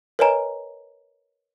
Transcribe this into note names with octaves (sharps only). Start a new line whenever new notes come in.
A#4 B4 C#5 D#5 G#5 A#5